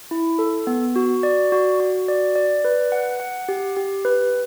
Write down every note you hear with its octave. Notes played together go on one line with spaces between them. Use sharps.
E4
A4
B3
F#4
D5
F#4
F#4
D5
D5
B4
F#5
F#5
G4
G4
B4